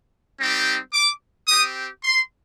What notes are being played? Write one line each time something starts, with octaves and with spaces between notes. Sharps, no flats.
G3 C4 D#4 G4
D6
C4 G4 D#6
C6